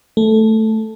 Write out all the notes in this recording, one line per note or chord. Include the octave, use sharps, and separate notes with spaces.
A3